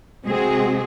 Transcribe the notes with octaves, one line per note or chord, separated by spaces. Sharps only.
C3 G#3 C4 F#4 G#4